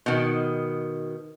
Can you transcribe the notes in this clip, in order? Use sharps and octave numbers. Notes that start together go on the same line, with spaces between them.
B2 D#3